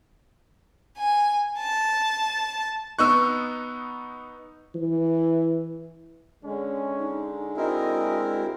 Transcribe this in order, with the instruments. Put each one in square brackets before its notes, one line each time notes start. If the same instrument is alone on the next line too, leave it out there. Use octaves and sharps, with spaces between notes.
[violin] G#5
A5
[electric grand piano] B3 D#4 F#6 [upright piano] C#6 E6
[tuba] E3
[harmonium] D3 G#3 [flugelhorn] C#4
[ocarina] D#4
[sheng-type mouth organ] C4 E4 A#4 [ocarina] F#4 [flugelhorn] D#5